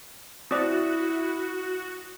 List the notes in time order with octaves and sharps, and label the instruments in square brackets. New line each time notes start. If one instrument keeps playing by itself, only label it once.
[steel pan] C4 D5 [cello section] E4 [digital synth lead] F#4 [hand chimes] D#6